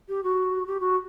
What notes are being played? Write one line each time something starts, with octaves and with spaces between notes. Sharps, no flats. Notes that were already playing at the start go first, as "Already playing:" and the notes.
G4
F#4
G4
F#4